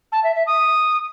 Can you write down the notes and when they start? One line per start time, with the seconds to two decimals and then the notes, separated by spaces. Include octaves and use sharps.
0.12 A5
0.23 E5
0.35 E5
0.46 D#6